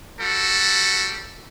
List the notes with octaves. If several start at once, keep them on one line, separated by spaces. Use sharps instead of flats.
G3 F#4 A4